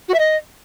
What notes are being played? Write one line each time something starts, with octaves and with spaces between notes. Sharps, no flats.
F#4
E5
D#5